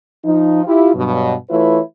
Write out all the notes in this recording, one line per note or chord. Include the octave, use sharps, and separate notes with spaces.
F3 D#4
E4 F4 G4
G2 B2 F#3
E3 A3 E4 F4 B4 C#5